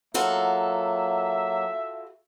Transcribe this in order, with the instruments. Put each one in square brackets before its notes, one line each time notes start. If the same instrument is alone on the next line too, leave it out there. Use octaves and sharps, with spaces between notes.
[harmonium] F#3 A#3 [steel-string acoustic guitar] F4 F#4 A4 [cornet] E5